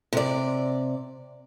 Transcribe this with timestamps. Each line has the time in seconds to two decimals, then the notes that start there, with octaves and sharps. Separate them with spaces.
0.13 C3 D5